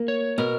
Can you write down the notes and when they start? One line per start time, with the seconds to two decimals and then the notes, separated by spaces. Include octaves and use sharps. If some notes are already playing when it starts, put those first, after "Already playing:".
Already playing: A#3
0.08 C#5
0.38 B2 A#4